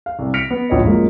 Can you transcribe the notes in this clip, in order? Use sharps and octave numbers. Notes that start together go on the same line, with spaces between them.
F5
C2
F6 A#6 B6 C#7 D7 F7
B3
D1 A#1 C#5 D#5
F#2 A#2 G#3 A#3